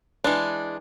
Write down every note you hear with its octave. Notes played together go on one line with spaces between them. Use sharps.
E3 G#3 D4